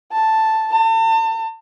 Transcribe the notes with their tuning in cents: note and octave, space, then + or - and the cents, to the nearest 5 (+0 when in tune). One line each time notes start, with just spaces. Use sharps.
A5 +5
A5 +35